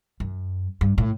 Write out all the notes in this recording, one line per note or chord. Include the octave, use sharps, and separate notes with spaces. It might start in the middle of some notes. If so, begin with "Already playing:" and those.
F#2
G2
A2